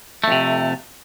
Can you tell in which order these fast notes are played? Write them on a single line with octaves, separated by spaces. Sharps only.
A3 F2 C3